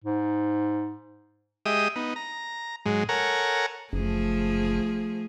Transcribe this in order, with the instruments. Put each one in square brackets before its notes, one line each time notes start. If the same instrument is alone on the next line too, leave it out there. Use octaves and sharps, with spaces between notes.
[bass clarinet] G#2
[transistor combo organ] G#3 G4 D#5 E5 D#6
B3 D#4
A#5
G#2 F#3 G#3
A4 A#4 C#5 F#5 G#5 A#5
[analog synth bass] F#1 [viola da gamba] F3 A3 G#4